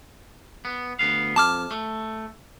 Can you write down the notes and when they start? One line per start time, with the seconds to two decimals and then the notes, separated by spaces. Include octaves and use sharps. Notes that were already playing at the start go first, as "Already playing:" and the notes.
0.65 B3
0.99 D2 B3 F5
1.36 F2 A5 D6 F6
1.71 A3